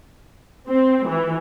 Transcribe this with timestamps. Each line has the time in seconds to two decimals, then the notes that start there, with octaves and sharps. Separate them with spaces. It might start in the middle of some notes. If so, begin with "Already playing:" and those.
0.68 C4
1.08 E3